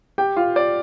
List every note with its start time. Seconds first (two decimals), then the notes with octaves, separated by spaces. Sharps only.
0.18 G4 G5
0.37 F4 F5
0.56 D5